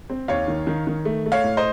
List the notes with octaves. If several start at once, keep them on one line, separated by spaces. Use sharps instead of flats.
C4
D#2 C#5 F5
D#3
D#3
D#3
A3
A3
C#5 F5
A2
C5 D#5